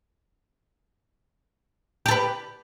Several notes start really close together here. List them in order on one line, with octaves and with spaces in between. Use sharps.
G4 A4 B4